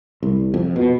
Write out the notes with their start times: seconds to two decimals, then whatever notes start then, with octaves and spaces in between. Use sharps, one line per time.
0.23 C2
0.54 F2
0.76 B2